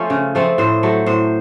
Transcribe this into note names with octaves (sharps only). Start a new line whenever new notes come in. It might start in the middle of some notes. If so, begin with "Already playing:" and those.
Already playing: F3 A3 C#4 C5
C#3
F3 A3 C4
A2 C5
F#3 A3
A2 C5